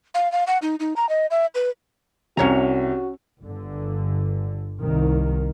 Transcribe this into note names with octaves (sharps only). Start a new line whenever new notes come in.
F5
F5
F#5
D#4
D#4
A#5
D#5
E5
B4
C2 C3 C#4 F#4 C#5 A#5
G1 D3
C2 D#3